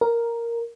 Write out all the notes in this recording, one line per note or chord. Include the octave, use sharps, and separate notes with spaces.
A#4